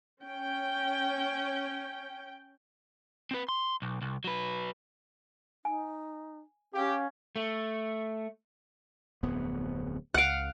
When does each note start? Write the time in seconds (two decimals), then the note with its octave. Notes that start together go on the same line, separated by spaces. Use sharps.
0.23 C#4 G5
3.31 C4 B4
3.49 C6
3.82 B1
4.02 C2
4.24 F#3 B4
5.65 D#4 G#5
6.74 C#4 G4 F5
7.36 A3
9.23 D1 F2 B3
10.14 C#2 F5 F#5 F#6 D7